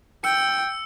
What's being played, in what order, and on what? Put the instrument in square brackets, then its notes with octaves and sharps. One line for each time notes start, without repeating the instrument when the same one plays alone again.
[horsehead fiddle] G5 [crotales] E6 C#7